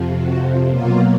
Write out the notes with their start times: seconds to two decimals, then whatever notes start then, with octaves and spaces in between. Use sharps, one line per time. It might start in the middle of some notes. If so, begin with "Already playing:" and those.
Already playing: F2 C3 F3
0.22 F#4
0.69 B2 F#3 A#3 F4